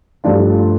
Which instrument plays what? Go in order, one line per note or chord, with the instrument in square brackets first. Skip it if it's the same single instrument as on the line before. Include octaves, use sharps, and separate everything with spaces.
[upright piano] G2 F3 A3 D4 F4